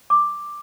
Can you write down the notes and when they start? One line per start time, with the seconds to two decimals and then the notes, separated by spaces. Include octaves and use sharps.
0.10 D6